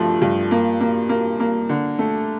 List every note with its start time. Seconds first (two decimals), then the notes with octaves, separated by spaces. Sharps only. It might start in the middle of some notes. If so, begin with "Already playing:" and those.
Already playing: G2 F3 A3
0.22 G2
0.51 A#3
0.81 A#3
1.09 A#3
1.40 A#3
1.69 D3
1.99 A3